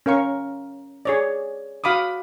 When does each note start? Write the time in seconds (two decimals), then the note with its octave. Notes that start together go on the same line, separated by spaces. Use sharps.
0.06 C#4 A#4 F5 C#6
1.05 G#4 C#5 D5
1.84 F#4 F5 B5 D6 D#6